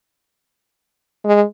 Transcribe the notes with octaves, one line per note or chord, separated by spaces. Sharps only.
G#3